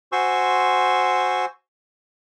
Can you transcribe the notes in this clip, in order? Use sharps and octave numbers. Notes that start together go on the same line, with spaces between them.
F#4 C5 G#5 C6 C#6 E6